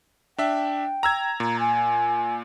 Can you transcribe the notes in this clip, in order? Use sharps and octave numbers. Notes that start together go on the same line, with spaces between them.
D4 E5 G5
A#5 E6 G#6
A#2 A#5
G#5